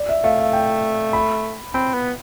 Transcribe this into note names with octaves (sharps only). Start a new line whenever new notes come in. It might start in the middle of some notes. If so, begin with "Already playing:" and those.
Already playing: D5
E5
A3 F5
F5
G5
B5
C4 B5
B3